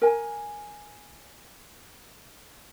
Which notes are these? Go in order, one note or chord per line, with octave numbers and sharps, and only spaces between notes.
A#4 G#5